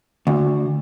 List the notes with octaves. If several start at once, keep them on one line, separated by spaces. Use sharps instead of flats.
D2